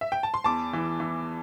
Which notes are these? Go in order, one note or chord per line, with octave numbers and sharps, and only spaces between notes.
E5
G5
A5
C6
E2 A5 D6
E3
E3